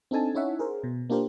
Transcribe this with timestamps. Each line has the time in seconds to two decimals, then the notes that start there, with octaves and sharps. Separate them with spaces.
0.11 C4 D4 D#4 A4 G#5 A5
0.35 C#4 D#4 E4 C#5 E5 F#5
0.59 G#4 A#4 C5
0.84 B2
1.10 A#3 D4 F4 G4 A#4 C5